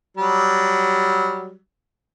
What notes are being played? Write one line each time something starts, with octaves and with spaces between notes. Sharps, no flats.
F#3 G3